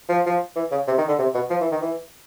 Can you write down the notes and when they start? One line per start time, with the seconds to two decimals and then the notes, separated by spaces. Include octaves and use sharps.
0.09 F3
0.26 F3
0.56 E3
0.71 C#3
0.87 C3
0.98 D#3
1.08 D3
1.19 C3
1.35 B2
1.50 F3
1.61 E3
1.71 D#3
1.82 E3